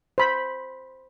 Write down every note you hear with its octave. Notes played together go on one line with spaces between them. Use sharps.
C5 B5